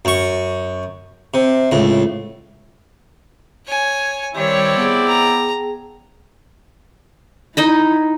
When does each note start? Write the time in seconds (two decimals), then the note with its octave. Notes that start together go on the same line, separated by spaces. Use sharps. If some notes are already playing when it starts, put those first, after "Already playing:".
0.05 F#2 C#6
1.34 C3
1.72 C#2 A2
3.66 C#5 G#5
4.35 D#3 G3 C4 E4 G4 C#5 D5
4.76 B3 G#4 G5 A5
5.08 A#5
7.57 D#4 E4 D#5 B5